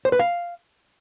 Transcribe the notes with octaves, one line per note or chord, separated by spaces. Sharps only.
C5
B4
F5